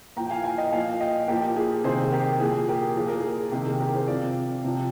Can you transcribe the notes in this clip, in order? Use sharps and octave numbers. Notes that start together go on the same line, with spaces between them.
A#2 F3 G5 A#5
G5
F5 G#5
F5 G#5
D#5 G5
A#2 F3 F5 G#5
D#5 G5
A#2 F3 G4 A#4
G#4
C3 D#3 G#4 C5
G4 A#4
A#2 F3 G#4
G4 A#4
A#2 F3 G#4
A#4
G#4
C3 D#3 G4
G#4
G4 A#4
G#4 C5
C3 F3 D5 F5
C3 F3